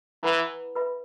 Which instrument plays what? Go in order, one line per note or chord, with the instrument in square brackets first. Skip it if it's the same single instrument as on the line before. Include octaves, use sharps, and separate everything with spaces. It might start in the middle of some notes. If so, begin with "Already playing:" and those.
[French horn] E3 [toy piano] E4 B4 F#5 B5
[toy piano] B4 E5 B5